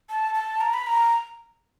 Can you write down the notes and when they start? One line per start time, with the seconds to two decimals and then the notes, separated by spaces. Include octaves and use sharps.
0.09 A5
0.35 A5
0.61 A#5
0.74 B5
0.87 A#5